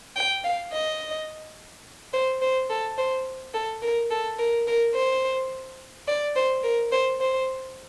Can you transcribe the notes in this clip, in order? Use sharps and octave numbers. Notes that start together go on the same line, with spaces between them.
G5
F5
D#5
C5
C5
A4
C5
A4
A#4
A4
A#4
A#4
C5
D5
C5
A#4
C5
C5